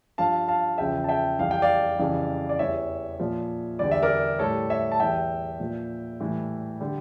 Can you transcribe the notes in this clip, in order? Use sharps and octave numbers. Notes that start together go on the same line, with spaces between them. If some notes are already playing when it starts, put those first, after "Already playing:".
G2 F3 F5 A5
F5 A5
E2 C#3 F3 E5 G5
A5
E5 G5
F2 E3 G3 F5
G5
D5 F5
F2 C#3 E3 G3
D5
E2 E3 G3 C#5 E5
A#2 F3
E2 D3 G3 D5
E5
A#4 D5
A2 G3 A4 C#5
C#5 E5
A5
E2 E3 G3 E5 G5
A#2 F3
A2 E3 G3
D3 G3